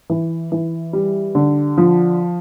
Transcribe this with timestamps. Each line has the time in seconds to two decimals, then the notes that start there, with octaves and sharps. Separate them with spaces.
0.10 E3
0.52 E3
0.93 G3
1.35 D3
1.78 F3